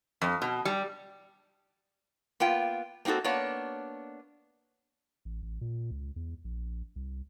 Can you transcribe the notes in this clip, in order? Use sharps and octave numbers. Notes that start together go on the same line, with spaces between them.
F2
B2
G3
A#3 B3 F4 G5
A#3 C4 D#4 F#4 A4
A#3 B3 D4 C#5
A1
A1
A#2
C#2
E2
A#1
C2